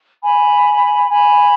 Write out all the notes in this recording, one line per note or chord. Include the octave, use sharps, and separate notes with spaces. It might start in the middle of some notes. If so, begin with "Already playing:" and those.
G#5 B5
G#5 B5